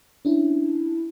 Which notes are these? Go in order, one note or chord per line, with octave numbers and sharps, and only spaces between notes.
C#4 D4 E4